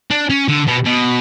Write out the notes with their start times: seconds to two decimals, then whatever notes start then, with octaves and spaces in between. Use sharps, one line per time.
0.11 D4
0.30 C#4
0.48 D3
0.67 B2
0.85 B2